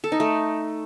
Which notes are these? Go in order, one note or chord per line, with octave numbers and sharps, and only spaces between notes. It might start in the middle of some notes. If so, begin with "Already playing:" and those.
A4
D#4
A3